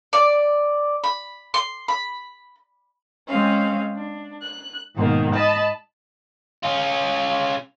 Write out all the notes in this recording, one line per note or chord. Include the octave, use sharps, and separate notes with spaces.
D5
B5
C6
B5
G#3 C4 C#4 F5
D4
F#6
G#2 B2 D#3 A#3
D#5 A5 B5
C#4 F4